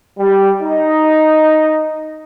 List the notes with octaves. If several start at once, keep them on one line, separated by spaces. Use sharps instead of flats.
G3
D#4